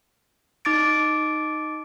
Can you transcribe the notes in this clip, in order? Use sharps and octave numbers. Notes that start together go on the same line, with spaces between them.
D#4 D6 A6 D7